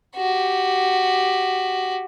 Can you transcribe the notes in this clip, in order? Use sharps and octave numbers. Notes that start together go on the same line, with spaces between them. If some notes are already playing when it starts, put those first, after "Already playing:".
F#4 G4